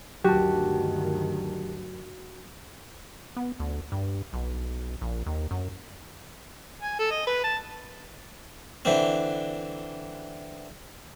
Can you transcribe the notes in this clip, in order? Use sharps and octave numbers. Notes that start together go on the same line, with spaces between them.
D2 G2 D#3 F#3 F#4 G4 A5
B3
D2
G2
B1
A#1
D#2
F#2
G#5
A4
D#5
B4
A5
D3 E3 C4